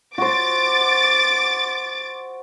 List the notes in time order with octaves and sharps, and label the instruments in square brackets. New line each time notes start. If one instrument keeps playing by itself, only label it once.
[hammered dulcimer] F#4 C5 [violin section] D6 A6